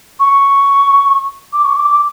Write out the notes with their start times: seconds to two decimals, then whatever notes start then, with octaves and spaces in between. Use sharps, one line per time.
0.20 C#6
1.53 D6
1.64 C#6
1.76 D6
1.90 D6